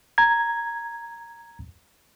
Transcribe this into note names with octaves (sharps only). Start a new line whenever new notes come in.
A#5 G#6